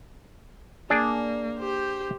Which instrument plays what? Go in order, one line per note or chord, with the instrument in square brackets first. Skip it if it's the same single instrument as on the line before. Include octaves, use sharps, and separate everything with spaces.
[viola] A#3 [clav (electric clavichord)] D4 G#4 D5
[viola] G4 C5